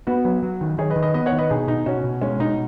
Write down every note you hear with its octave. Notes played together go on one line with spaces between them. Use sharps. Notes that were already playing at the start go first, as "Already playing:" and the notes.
B3 F#4 B4
F#3 F#4 B4
F#3
D#3
D#3 G#4 C#5
B4 D#5
D#3
B4 D#5
B3 B4 D#5
C#5 F#5
D#3
B4 D#5
B2 D#4 G#4
B2 D#4
B2 C#4 F#4
B2
G#3 C#4
B2 D#4